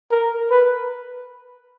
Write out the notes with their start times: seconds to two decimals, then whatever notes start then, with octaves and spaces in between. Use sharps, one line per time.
0.11 A#4
0.50 B4